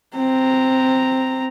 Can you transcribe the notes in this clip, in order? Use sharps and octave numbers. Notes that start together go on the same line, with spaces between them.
C4 A#5